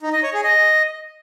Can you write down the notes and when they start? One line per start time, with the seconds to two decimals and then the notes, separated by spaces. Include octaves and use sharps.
0.02 D#4
0.13 D#5
0.23 C#5
0.33 G#4
0.44 D#5